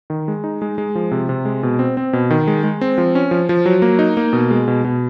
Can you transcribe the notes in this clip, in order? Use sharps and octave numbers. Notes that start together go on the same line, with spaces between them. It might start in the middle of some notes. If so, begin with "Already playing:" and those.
D#3
G#3
D#4
G#3
G#3
F3
C3
C3
G#3
B2
C4
C4
B2
D#3
G#3
G#3
C4
F3
C#4
F3
F3
F#3
A#3
D#4
A#3
B2
G#3
B2
B2